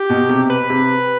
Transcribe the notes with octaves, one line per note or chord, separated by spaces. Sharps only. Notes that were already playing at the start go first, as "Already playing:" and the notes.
Already playing: G4
B2
C3
B4
C3